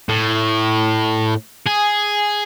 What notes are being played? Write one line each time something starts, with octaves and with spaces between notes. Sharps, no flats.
A2
G#4